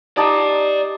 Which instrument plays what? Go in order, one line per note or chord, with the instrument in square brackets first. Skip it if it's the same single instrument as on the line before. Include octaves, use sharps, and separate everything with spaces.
[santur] D#4 G4 A5 [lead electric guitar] D5 A#5